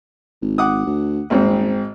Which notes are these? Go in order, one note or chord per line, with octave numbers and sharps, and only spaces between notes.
G#1
F#5 D6 D#6
D2
D#1 G#1 G#2 C4